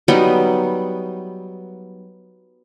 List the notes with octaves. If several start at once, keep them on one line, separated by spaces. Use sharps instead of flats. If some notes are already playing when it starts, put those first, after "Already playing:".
F#3 G3 B3 D#4